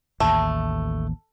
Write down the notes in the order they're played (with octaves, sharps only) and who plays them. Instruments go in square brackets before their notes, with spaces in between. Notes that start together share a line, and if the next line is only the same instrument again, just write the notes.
[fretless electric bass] A1 D#2 [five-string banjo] A3